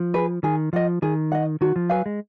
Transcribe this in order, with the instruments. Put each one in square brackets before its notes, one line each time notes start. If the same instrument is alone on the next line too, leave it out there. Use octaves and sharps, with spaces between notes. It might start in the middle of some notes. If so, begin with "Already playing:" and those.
Already playing: [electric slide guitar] F3
[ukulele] G#4 B4
[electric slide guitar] D#3 [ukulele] G#4
[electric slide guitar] F3 [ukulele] D#5 F#5
[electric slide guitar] D#3 [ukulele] G#4
[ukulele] D#5 F#5
[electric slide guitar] D#3 [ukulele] F#4
[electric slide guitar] F3
[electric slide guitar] F#3 [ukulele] B4 F5 G#5
[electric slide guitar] G#3